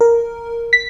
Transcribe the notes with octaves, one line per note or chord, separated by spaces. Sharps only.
A#4
B6